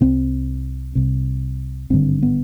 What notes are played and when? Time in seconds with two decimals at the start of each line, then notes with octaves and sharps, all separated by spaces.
0.01 C2 C3 C4
0.95 C2 C3
1.90 G#1 G2 D3 C4
2.23 B3